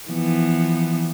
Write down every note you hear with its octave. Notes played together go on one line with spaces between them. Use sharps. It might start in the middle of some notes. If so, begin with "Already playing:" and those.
E3 F3 B3